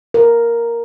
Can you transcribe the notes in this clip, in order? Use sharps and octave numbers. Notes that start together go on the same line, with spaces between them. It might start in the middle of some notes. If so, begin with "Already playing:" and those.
A#4